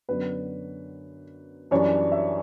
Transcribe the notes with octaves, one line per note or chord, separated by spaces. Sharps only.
F#2 D3 F#3 B3 B4
F#2 E3 G3 D4 C#5
E5